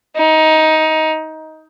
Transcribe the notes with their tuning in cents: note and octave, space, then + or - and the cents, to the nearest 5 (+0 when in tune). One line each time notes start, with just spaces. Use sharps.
D#4 +15